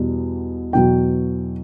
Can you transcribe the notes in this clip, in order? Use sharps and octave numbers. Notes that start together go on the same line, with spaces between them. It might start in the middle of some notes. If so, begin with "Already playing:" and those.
Already playing: E2 B2 G3
E2 B2 F#3 G5